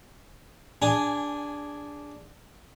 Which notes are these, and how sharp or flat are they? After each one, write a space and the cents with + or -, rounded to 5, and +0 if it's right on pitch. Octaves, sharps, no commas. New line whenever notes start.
D4 -10 G#4 -20 G#5 +0